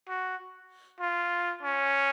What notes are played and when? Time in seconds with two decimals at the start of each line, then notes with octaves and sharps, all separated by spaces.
0.08 F#4
1.00 F4
1.63 C#4